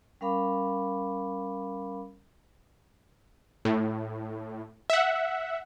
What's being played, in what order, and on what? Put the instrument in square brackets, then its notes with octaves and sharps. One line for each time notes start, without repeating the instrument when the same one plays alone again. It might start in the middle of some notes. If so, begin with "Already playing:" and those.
[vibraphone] G3 C#4 A#4 F5 B5 D6
[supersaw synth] A2
E5 F#5